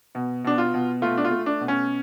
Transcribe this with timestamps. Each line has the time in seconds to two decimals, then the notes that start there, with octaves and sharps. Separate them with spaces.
0.15 B2
0.44 B2 D4
0.58 F4
0.74 B2
1.02 A3 F4
1.18 D4
1.24 F4
1.31 A3
1.46 D4
1.60 B2
1.68 C#4